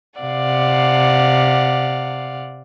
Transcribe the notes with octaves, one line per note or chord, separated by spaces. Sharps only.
C3 D5 F5 F#5